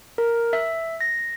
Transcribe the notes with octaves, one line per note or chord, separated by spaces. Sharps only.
A#4
E5
A#6